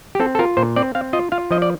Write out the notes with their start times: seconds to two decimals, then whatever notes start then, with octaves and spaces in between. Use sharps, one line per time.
0.15 G4
0.20 C4 A4
0.35 A4
0.39 F4 A#4
0.57 A#2 C5
0.76 C4 D5
0.95 C4 F5
1.13 F4 D#5
1.32 F4 F5
1.51 F3 D#5
1.62 D5